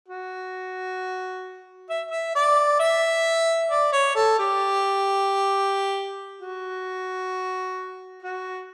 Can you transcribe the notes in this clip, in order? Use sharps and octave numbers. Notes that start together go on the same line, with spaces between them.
F#4
E5
E5
D5
E5
D5
C#5
A4
G4
F#4
F#4